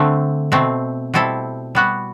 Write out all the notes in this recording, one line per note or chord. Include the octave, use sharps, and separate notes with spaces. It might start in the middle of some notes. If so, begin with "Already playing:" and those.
Already playing: D3 A3 C4
B2 A3 C4
B2 G3 C4 E4 A4
G3 B3 F#4